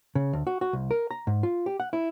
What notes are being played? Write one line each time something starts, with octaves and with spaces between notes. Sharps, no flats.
C#3
D2
F#4
F#4
C2
A#4
A#5
G#2
F4
G4
F#5
E4